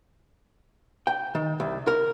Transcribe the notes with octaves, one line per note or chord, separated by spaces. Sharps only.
G5
D#3
C2
A#4